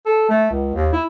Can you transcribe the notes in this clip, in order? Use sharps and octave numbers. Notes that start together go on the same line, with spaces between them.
A4
A3
C#2
D#2
E4